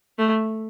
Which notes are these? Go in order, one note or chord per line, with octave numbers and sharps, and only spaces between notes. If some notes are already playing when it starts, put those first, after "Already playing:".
A3